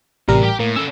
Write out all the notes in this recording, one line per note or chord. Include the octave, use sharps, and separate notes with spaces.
A1 C3 G3 A#4
G4 G5
A2 A#3
C#4 A4 E6